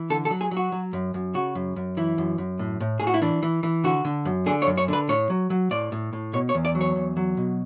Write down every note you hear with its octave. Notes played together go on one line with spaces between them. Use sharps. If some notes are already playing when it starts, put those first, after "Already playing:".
Already playing: E3
D3 A4
A4
F#3
G#4
F#3
F#4
F#3
F#2
F#2
C#3 F#4
F#2
F#2
E3 E4
F#2
F#2
A2
A2
A2 G#4
F#4
E4
E3 D4
E3
E3
D3 F#4
D3
F#2
D3 G#4
C#5
F#2
C#5
D3 B4
A2 C#5
F#3
F#3
A2 D5
A2
A2
B2 C#5
C#5
E2
D5
F#3
C#5
E2
F#3
B2